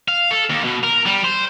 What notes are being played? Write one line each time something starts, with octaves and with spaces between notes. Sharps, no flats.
F5
A4
D#2
B2
A#4
G3
C5